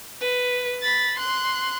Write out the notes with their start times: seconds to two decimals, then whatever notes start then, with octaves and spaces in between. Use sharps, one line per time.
0.21 B4
0.82 B5 A6
1.18 C6 F#6